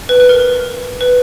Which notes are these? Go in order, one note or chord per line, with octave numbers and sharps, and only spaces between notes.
B4
B4
A#4
A#4
B4